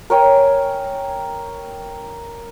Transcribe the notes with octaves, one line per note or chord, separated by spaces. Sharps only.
A#4 C#5 G5 G#5